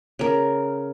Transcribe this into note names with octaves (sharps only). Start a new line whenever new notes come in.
C#3 A#4